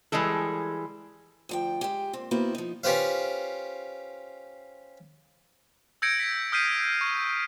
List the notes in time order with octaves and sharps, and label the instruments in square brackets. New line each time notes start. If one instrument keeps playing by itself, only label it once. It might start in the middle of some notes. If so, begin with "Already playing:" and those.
[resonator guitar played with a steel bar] E3 G3 G#3 G#4 A4
[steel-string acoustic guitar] D2 F3 G5
G#3 G4
A#2 C4
D#3 A#3 B3 E4 F#4 C5
F3 D#4
[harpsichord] C#4 F4 G4 B4 C5 F5
[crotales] E6 G6 G#6 A#6 C#7 D7
B6 C#7
D#6 F6 G6 B6 C7 D#7
C#6